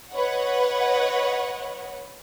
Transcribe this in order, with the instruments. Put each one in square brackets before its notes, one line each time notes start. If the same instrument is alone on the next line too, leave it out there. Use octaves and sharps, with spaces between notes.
[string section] B4 C#5 D#5 F#5